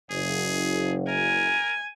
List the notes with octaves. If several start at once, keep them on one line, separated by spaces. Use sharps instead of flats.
F#1 G#4
A#4 G#5